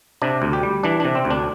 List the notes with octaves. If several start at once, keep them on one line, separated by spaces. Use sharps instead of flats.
C3 D4
D2
G4
G3
E3 D4
C3 D4
C4
D2
D4